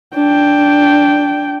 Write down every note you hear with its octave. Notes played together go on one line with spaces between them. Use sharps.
D4 G5